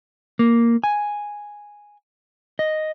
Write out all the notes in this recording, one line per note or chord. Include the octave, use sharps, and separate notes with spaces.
A#3
G#5
D#5